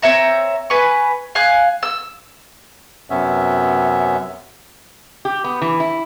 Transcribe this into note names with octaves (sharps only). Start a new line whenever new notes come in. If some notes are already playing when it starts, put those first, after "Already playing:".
C4 C#5 E5 A#5
B4 G#5 C#6
F5 G#5 F#6
E6
F#2 C3 B3 C#4 E5
G4
B3
E3
E4